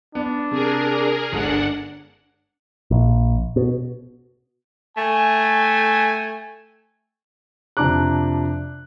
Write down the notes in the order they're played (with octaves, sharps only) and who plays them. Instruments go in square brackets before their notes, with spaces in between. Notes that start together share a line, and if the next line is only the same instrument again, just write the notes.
[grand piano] B3 [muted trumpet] D4
[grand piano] C3 [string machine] G#4 A#4
[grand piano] G1 G#3 [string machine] D4 F#5
[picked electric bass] A#1
B2
[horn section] A3 G5 G#5
[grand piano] F2 C3 D4 A#5 D6 F#6